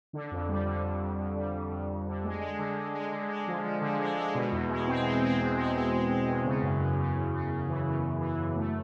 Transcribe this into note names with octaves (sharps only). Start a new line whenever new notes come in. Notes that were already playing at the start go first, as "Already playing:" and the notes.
D3
F2
G3
D3
F2
F2
F2
G3
F2
F2
F2
D3
G#3
G#3
D3
G#3
G#3
D3
G#3
F3
F3
D3
G#3
G#3
B2
E2
G#3
C4
G#3
C4
E2
G#3
G#3
G#3
G#3
E2
C#3
F#2
F#2
C#3
F#2
C#3
C#3
E3
C#3
F#2
E3
F#2
A3